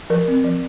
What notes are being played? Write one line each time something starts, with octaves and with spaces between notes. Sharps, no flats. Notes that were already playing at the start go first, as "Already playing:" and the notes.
F3 A#4
C4
F3